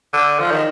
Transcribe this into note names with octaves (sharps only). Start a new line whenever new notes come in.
D3
F3
D#3